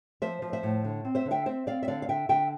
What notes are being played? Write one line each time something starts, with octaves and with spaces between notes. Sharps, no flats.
F3 C5 E5
F3
C5 E5
A2
D3
C4
C5 E5
D3
E5 G5
C4 C5 E5
C4 D5 F5
E5
D3 D5 F5
F5
D3 E5 G5
D3 E5 G5